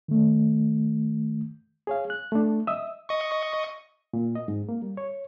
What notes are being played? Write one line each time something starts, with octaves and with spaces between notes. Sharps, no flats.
D#3 A3
G#4 C#5 F5
F#6
A3 D4
D#5 E5 D#6 E6
D#5 C#6
A#2
D#5
G#2
A#3
G3
C#5